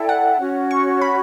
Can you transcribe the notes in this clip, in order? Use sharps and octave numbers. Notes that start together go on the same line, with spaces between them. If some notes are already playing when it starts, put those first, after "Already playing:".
Already playing: E4 A4 D5 G5
F#5
C#4 F#4 C#5
C#6
B5